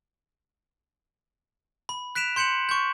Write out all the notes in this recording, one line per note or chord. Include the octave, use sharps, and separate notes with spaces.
B5
F#6 B6 D7 E7 F7
C6 G6 C#7 E7 F#7
C#6 G6